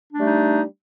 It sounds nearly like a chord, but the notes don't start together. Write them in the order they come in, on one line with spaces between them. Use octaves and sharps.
D4 A3 G3 D#4